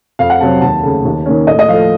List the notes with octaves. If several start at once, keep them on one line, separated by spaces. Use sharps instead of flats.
F2 F5
F#5
C3 F#3 C4 A5
D#2 A5
C#3 A3
D#2
D#3 A#3 C#4
A2 D#5
D#5
F3 A3 F5